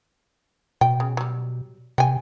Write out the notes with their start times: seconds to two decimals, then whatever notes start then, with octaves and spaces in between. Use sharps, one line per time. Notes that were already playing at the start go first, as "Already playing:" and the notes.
0.81 B2 G5
1.00 C#3
1.17 F#3 G3
1.98 C3 G5 G#5